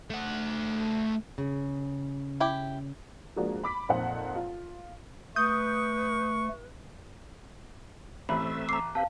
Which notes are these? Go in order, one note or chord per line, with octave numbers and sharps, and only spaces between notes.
A3 F#5
C#3
E4 G4 G5
F3 G#3 A#3 D4 F#4
B5 D6 B6
F2 A#2 D#4 C5 F#5
F4
A3 B4 C#6 D#6 G6
A1 A3 C4 E5 B5
A#5 D6 C7
C4 G4 B4 F5 A5